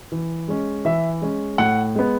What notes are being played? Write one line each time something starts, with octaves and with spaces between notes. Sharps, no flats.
E3
G#3 C#4
E3 E5
G#3 C#4
A2 F#5
G#3 B3